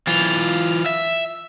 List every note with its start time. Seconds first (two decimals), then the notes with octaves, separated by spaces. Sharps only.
0.07 E3 F4
0.86 E5